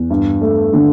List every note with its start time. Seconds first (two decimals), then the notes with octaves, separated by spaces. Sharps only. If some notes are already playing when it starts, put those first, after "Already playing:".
Already playing: E2
0.10 G2
0.42 A3
0.73 D3